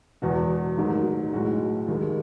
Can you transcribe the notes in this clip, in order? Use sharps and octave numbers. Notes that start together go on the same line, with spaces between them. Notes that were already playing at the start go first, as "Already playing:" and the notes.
E1 E2 B2 F#4
A1 G#2 D#3 F#3
B1 A2 G#3 F#4
D#2 D#3 G#3